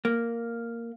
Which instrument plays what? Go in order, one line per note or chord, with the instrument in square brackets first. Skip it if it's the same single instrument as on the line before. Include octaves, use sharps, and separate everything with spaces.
[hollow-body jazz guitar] A#3